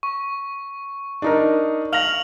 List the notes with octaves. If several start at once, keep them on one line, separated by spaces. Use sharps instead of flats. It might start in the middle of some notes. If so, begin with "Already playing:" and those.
C#6
D4 D#4 A#4
F5 F6 A#6 F7 F#7